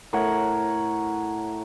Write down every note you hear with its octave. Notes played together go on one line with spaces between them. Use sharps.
A2 A#4 C#5 F#5